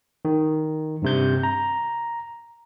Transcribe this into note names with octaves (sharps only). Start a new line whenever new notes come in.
D#3
G2 C3 G6
A#5